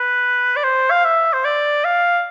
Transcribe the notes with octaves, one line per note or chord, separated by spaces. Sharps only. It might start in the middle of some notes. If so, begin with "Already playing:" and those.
Already playing: B4
D5
C5
F5
E5
C5
D5
F5